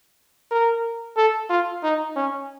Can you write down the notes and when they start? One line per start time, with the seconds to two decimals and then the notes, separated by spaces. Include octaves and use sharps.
0.51 A#4
1.17 A4
1.50 F4
1.83 D#4
2.16 C#4